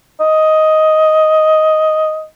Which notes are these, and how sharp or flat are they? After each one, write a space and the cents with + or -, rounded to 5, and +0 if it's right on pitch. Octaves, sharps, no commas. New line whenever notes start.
D#5 +10